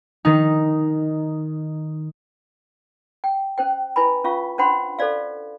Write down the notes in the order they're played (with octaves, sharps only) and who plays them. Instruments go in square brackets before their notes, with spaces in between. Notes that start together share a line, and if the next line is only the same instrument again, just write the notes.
[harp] D#3 D#4
[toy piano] G5
C#4 C5 G5
E4 B4 G#5 B5
C#4 F4 F5 C#6
C#4 D4 C5 F#5 B5 C6
A4 C5 D5 F5